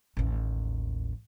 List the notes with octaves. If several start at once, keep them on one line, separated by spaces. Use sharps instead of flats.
A1 D#2